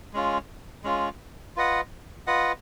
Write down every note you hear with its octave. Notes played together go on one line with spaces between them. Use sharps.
G#3 C#4 F4
G#3 C#4 F4
F4 B4 D#5 F#5
F4 B4 D#5 F#5